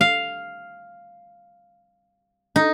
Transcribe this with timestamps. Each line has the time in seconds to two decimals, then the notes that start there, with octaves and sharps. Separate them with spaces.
0.01 F5
2.56 D#4